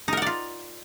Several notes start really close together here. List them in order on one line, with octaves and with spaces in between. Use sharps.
D#4 A#4 F#5 D5 F4